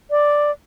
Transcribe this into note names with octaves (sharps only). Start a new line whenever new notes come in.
D5